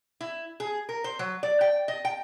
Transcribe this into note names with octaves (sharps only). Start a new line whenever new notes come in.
E4
G#4
A#4
C5
F#3
D5
G5
D#5
G5